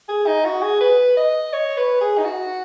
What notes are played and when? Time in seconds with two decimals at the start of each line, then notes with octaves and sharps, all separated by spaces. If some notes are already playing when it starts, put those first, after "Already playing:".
0.09 G#4
0.27 D#4
0.45 F#4
0.62 G#4
0.81 B4
1.17 D#5
1.53 C#5
1.77 B4
2.01 G#4
2.18 D#4
2.24 F#4